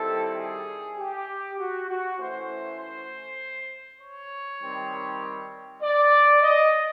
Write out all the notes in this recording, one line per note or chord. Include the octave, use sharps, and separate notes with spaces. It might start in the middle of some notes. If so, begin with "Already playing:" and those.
Already playing: D#3 G3 C4 E4 A4
G#4
G4
F#4
F#4
E3 A3 C#4 E4 C5
C5
C#5
D#3 G3 C4
D5
D#5